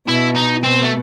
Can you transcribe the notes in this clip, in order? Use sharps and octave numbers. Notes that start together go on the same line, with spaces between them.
B2 E4
D#4
B2 C4
A3